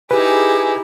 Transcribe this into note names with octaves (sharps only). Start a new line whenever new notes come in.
D#4 E4 G4 G#4 B4 G#5